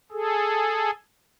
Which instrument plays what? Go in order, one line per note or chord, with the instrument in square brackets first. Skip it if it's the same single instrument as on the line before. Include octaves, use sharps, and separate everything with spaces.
[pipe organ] G#4 A4